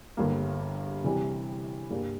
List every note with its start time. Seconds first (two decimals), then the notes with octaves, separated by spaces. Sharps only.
0.17 G1 G2 G3 A#3
1.04 C3 E3 G3
1.90 G2 G3 A#3